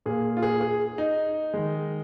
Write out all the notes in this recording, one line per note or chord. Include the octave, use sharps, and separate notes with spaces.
A#2 A#3 G#4
F4
G#4
G#4
D#4
D#3 G#3